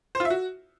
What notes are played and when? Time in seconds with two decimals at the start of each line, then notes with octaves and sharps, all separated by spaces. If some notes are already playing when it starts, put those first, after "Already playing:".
0.15 C5
0.20 F4
0.25 E5
0.30 F#4